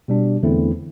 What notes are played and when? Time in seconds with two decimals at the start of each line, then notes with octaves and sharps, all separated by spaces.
0.08 B2 G3 D4
0.43 E2 D3 A3 C4 E4